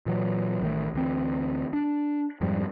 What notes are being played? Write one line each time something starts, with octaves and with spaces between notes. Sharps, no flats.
A#2 E3 F#3
A1 D#3 A3
D2 E3 C4
D4
F2 G#2 F3 G3